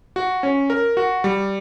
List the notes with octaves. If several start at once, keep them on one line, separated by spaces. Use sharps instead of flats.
F#4
C#4
A#4
F#4
G3